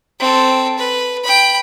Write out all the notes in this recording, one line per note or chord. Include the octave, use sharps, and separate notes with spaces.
C4 A4
B4
G5 B5